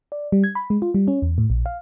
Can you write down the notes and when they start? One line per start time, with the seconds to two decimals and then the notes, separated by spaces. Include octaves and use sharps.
0.12 D5
0.32 G3
0.44 G#6
0.55 B5
0.70 G#3
0.82 F4
0.94 G3
1.08 C#4
1.22 E2
1.38 A2
1.50 A#1
1.66 F5